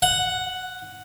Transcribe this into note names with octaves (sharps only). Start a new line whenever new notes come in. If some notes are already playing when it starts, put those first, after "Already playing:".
F#5